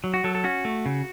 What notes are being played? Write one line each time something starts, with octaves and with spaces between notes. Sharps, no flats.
F#3
F#4
F#3 A4
A4
C#4 F#4
A3
C#3